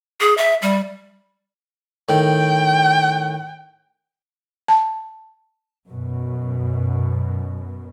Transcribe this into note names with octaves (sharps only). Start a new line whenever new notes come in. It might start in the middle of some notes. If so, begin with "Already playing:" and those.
G#4
E5
G3
A2 D#3 G5
A5
F#2 B2